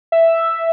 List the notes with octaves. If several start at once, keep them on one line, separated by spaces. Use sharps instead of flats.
E5